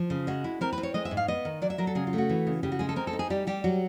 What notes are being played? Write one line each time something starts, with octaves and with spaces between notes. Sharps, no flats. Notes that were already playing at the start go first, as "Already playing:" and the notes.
Already playing: F3
C#3
G#3 F#4
E4
C4 A#4
B4
C4
C#5
G#3 D#5
E5
G#2
F5
B3 D#5
D#3
F#3 D5
E5
F#3 A#4
A4
C#3 G#4
F4
A3
F#4
E3
C#3
C#3 G4
F#4
G#3 G#4
A4
C4 A#4
A4
D#4
G#4
G3 G4
G3 G4
F#3 F#4